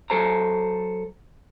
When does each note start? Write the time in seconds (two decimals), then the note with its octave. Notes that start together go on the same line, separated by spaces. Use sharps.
0.10 F#3 A4 C5 A#5